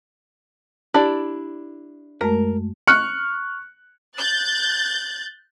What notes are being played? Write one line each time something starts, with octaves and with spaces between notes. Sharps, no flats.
D4 E4 G4 D5
F#2 G#3 A3 A#4
C#6 F6 F#6 C#7
F#6 G6 A6